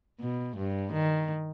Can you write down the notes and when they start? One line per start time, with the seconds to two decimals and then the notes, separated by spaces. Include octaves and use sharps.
0.21 B2
0.57 G2
0.93 D#3